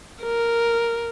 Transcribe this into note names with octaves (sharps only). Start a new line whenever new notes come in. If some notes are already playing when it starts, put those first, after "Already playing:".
A#4